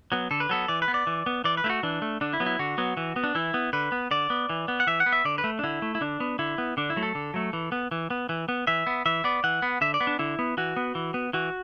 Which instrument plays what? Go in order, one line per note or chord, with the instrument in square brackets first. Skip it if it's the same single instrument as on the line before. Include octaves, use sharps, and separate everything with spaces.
[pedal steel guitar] F#3 B3
D3 A4
B4
F#3 B3 A4
E3 D5
B4
B3
D5
E3
B3
E3 D5
B4
A3 E4
F#4
E3 D4
A3
D3 D4
E4
F#3 B3
E4
D3 F#4
F#3 B3
E3
B3
D4
E3 E4
B3
D3 B4
B3
D3 D5
B3
E3
B3
F#5
E3 E5
F#5
B3
E5
D3 D5
B4
A3
D4
D3 E4
A3
E4
D3 D4
B3
D3 E4
B3
D3 D4
E4
F#3 A3
A4
D3
F#3 A3
E3
B3
E3
B3
E3
B3
E3 E5
B3
E3 E5
B3 D5
E3 F#5
B3
D3 E5
D5
B3
D4
D3 E4
B3
E3 F#4
B3
E3
B3
E3 F#4